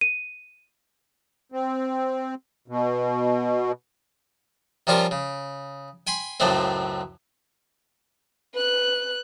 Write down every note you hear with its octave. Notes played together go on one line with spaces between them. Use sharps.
D#7
C4
B2
C3 F3 G3 C#4 F4 A#4
C#3
G5 G#5 B5 C6
C#2 F#2 A2 G#3 A3 C4
B4 F#6